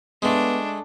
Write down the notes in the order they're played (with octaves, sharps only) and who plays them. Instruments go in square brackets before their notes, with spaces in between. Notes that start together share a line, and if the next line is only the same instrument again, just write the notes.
[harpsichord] G#3 A3 [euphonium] B3 [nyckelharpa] D4